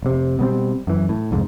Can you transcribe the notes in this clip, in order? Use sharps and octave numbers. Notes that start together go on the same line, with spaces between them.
F1 C3
B2 G3 C4
F#2 E3
A2
C2 F2 G#2